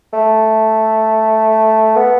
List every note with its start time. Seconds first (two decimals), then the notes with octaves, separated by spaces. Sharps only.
0.13 A3
1.96 B3